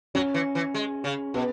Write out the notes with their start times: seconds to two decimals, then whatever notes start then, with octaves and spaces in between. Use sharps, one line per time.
0.15 F#3 C#4
0.34 E3
0.55 E3
0.74 G#3
1.04 C#3
1.34 B2 B3